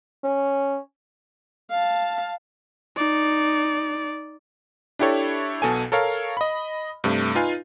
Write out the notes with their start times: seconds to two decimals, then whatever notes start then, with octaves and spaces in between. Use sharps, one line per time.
0.24 C#4
1.71 F5 A5
2.97 D#4 D5
4.99 D4 E4 G4 A4 C#5
5.62 B1 B2 A4 G#5
5.92 A4 A#4 C#5 F5
6.37 D#5 B5
7.04 G2 C3 A3
7.35 D#4 F4 B4 F5 G#5